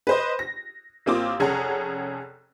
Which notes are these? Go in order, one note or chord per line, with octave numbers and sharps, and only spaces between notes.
B4 C5 D#5
A#6
A1 A#3 C4 F4 D6 D#6
F1 C#4 G#4 A4 F#5 A#5